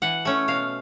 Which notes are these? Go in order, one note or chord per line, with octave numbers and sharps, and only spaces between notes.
E3 F#5
A3 C#4
B2 F5